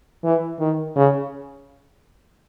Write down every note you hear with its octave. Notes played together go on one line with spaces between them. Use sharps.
E3
D#3
C#3